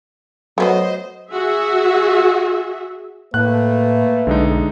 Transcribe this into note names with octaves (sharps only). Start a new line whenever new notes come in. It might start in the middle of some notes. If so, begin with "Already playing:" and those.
F#3 A3 B3 F#4 C5 D#5
F#4 G#4 E5
A2 A3 A#3 B4 F#6
B1 D3 G#3 D#4